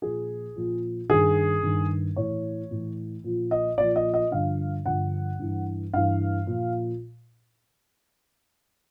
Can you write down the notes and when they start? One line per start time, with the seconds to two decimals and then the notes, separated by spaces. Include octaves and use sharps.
0.02 A#2 F3 G#4
0.56 A#2 F3
1.09 G2 D#3 G#4
1.63 G2 D#3
2.16 A2 E3 C#5
2.71 A2 E3
3.24 A#2 F3
3.51 D#5
3.78 A#2 F3 D5
3.96 D#5
4.14 D#5
4.31 G2 D3 F3 F5
4.86 G2 D3 F3 F#5
5.39 G2 E3
5.93 G2 E3 F5
6.47 A#2 F3